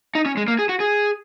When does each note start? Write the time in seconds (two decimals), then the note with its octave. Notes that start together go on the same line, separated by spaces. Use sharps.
0.15 D#4
0.26 C#4
0.37 G#3
0.48 A#3
0.59 G#4
0.69 F#4
0.80 G#4